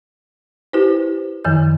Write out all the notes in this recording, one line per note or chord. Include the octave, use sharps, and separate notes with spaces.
E4 G4 B4 C5
F#2 D#3 F3 G6